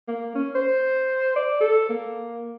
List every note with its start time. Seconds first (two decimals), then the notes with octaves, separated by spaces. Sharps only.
0.08 A#3
0.35 C#4
0.55 C5
1.36 D5
1.61 A4
1.89 A#3